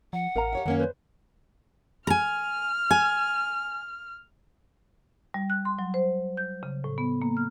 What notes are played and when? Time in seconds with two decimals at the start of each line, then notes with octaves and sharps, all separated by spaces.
0.13 F3 F#5
0.36 A1 A#4 F5 A#5
0.53 G4 C#5 E5
0.66 F#2 D#3 A#3 C#4
0.79 B4 C5
2.07 G#5 A#5 F6
2.91 G#5
5.34 G3
5.50 F#6
5.65 C6
5.79 F#3
5.94 C5
6.37 G6
6.63 C#3
6.84 A2
6.98 B3
7.22 A#3
7.37 F6